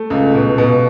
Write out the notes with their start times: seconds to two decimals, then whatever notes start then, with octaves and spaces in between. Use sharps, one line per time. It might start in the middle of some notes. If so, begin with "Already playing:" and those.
Already playing: A3
0.10 C#2
0.35 B2
0.58 B2